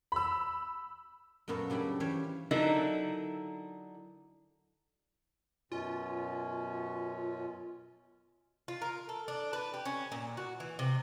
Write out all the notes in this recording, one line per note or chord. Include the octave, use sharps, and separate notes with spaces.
B5 E6
F#2 A#2 B3 F#4 A4 F5
C#3 G3 D4 E4
E3 C#4 G4 C5 C#5 F5
D3 F#3 D#4 E4 A#4
F#2 B2 C#4 F4
F4
A#4
A4
D4
B4
G4
C#4
A#2
F#4
E3
C3